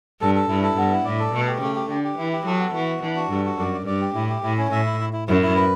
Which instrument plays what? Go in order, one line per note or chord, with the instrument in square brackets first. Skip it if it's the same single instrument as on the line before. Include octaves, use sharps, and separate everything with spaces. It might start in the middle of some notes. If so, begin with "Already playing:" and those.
[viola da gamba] G2 [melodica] A4
[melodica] A4
[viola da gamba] G2 [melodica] E4
[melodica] A4
[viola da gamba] G2 [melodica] B3
[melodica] E4
[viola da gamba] A2 [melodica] D5
[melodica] A4
[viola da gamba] B2 [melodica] A3
[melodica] G4
[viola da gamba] C#3 [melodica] A3
[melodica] G4
[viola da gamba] D3 [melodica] G4
[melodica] G4
[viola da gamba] E3 [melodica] E4
[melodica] G4
[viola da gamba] F#3 [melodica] A4
[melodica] B3
[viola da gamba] E3 [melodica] F#4
[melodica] B3
[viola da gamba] E3 [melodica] D4
[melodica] F#4
[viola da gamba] G2 [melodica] A4
[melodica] F#4
[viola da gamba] F#2 [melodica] D5
[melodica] D5
[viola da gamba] G2 [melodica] D5
[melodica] G4
[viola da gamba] A2 [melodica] E4
[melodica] G4
[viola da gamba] A2 [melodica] E4
[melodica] C#4
[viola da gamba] A2 [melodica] E5
[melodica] E4
E4
E4
[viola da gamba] F#2 [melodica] E4
[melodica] E4
B4